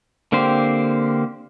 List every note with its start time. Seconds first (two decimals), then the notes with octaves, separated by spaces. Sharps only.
0.32 D3 A#3 C4 G4 C5